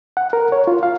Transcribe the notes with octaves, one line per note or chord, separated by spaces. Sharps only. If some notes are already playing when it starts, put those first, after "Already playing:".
F#5
A#4
C#5
F4
F5